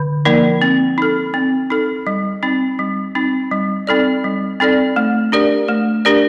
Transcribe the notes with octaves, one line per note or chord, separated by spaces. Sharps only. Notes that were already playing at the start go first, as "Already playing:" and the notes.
Already playing: D3
F3 A#3 D#4 A#4
C4
D#4 A4
C4
D#4 A4
G3
C4 D#4
G3
C4 D#4
G3
C4 D#4 A4 D5
G3
C4 D#4 A4 D5
A3
D4 G4 A#4 D5
A3
D4 G4 A#4 D5